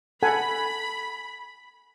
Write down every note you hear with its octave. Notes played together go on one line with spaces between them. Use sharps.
A4 F#5 G#5 B5